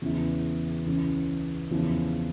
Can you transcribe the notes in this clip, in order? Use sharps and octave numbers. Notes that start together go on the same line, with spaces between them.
E2 C#3 E3
C#2 C#3 E3
E2 C#3 F3 C#4 E4